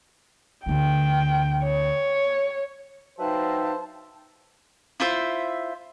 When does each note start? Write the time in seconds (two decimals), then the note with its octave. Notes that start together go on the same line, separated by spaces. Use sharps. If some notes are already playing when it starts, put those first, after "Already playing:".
0.66 D2 D3 G5
1.63 C#5
3.19 F#3 D#4 B4 C5 E5 F5 G5 A5
5.00 E4 F4 C5 E5